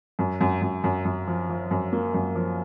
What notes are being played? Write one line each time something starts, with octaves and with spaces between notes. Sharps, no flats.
F#2
F#2
F#2
F#2
F#2
F3
F3
F#2
A#3
F#2
F3